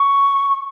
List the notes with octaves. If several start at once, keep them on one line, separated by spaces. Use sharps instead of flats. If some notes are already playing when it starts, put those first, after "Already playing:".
Already playing: C#6